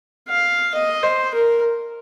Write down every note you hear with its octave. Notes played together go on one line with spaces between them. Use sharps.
F5
D#5
C5
A#4